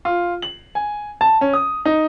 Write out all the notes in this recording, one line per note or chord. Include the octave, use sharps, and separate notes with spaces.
F4
F#7
G#5
A5
C#4
D#6
D#4